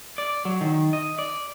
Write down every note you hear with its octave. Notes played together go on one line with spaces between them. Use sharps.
D5
F#3
D#3
D#5
D5